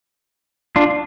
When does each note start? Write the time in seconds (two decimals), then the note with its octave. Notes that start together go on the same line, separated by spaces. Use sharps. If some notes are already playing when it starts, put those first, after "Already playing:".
0.76 D4 F4